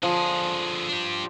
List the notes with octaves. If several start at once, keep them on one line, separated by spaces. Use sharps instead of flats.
D3 F3 G#4
D4 G4